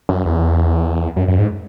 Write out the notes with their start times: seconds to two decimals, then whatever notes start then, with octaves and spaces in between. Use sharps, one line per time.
0.09 F#2
0.25 E2
1.16 F#2
1.28 F#2
1.39 G#2